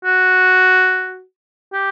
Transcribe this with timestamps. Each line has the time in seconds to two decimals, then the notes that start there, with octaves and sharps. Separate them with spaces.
0.04 F#4
1.73 G4